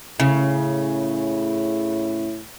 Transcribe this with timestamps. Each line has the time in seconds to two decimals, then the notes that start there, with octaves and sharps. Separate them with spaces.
0.20 A2 C#3